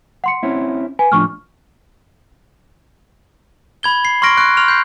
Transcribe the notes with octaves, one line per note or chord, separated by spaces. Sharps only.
F#5 C6 C#7
C4 C#4 E4
B4 G#5
A2 F3 D4 C#6 F6
B5 G#6 G7
C7
C6 C#6 F6 A#6 D7
C#6 F#6 D7
C6 F6 F7
G6 C7